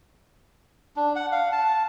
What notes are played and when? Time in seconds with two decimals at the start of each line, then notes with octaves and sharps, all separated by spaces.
0.96 D4
1.16 F#5
1.32 F5
1.52 A5